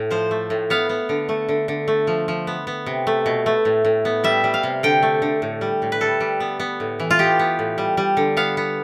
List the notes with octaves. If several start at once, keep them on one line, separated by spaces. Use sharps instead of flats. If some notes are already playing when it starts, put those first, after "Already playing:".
Already playing: A2
F3 C5
A3
A2
B3 F5
B3
D3
A3
D3
D3
A3
F3
F3
B3
B3
C3
A3
B2
A3
A2
A2
B3
G3 E5
G3
F5
C3
D3 G5
A3
D3
A2
G3
A2
B4
G3 A4
G3
B3
B3
A2
E3
F4
B3 G4
B3
A2
G3
G3
D3
B3 F5
B3